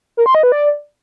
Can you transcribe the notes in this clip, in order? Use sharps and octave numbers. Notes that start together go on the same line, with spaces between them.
A#4
C6
D#5
B4
D5